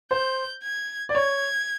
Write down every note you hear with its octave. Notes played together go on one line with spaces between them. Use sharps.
C5 G6
G#6
D5
C#5 G#6